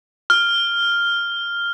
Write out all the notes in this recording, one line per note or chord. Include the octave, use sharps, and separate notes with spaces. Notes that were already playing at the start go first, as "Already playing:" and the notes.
F6